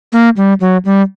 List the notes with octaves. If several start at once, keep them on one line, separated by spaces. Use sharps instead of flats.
A#3
G3
F#3
G3